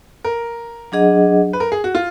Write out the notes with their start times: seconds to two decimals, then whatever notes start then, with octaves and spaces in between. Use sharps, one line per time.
0.24 A#4
0.92 F#3 D4 G#4 D#5 F#5
1.53 B4
1.60 A#4
1.72 G#4
1.84 F#4
1.95 F4